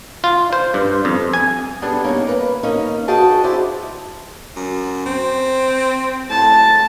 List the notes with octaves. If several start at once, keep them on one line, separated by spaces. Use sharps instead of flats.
F4
C5
G2
F2
G#5
G3 B3 D4 G#4 A4
A#3 B3 C#4 D#4
A#3 B4
D#2 A#3 C#4 D#4
G2 F#4 G#4 D#5 G5 A5
E4 C5 D5
F#2
C4
A2 A5